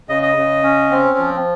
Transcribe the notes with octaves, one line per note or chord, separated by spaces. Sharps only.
C#3 D#5
D#5
C#3
C#4
C4
F3